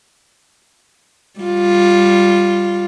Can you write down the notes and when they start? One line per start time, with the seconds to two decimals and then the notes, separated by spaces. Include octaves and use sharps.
1.40 G3 F4